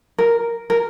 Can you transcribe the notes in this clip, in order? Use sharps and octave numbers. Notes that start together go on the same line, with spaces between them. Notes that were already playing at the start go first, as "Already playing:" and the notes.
A#4
A#4